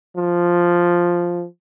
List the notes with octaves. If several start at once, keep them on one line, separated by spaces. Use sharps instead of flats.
F3